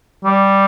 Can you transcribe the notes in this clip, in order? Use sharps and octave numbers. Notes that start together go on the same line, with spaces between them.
G3